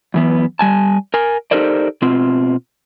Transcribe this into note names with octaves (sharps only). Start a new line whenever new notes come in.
F#2 E3 B3
G3 G#5 A5
A#4 G#5
D#4 G4 A4 A#4 C5 D5
B2 C4 F4